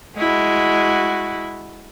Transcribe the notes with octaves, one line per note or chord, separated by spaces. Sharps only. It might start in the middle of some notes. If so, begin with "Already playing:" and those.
G#3 E4 F#4